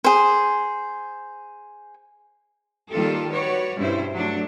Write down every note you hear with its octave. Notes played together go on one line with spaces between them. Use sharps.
G#4 C5
D#3 G3 A#3 F4 G4 A4
F#4 B4 C#5 D5
G2 B2 C#4 E4 C5
F#3 A3 D4